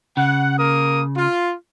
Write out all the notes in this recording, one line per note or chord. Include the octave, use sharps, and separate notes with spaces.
C#3 F#5
A#3 A#4 D#6
F4